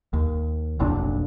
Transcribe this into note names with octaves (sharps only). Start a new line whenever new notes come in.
D#2
F1 B1 A#2 D4